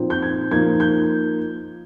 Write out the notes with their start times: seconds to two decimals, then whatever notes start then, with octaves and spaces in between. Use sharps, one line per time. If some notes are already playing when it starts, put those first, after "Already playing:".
Already playing: A#2 F3 C4 D#4
0.10 G6
0.22 G#6
0.51 F3 A#3 D#4 G#6
0.80 G6